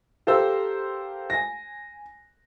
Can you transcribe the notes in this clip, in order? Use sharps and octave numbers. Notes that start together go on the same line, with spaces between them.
G4 A4 A#4 C5 F5 E6
G#5 A#6